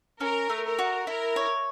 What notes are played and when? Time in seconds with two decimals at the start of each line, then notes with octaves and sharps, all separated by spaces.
0.21 C#4 A#4
0.50 A3
0.64 A#4
0.79 F#4
1.07 E4 A#4
1.36 C#5